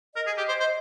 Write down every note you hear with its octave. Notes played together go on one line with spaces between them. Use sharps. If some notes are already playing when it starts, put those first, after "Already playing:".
A#4 D#5
G#4
G4
C5
C5